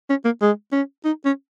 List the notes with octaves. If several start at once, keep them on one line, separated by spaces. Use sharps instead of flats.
C#4
A#3
G#3
C#4
D#4
C#4